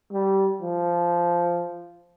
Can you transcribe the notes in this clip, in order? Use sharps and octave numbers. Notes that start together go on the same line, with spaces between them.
G3
F3